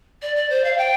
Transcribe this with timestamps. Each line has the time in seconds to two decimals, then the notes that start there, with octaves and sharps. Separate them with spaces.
0.22 D5
0.36 D5
0.50 C5
0.64 F5
0.78 G5